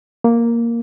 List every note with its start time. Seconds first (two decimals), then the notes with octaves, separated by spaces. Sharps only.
0.24 A#3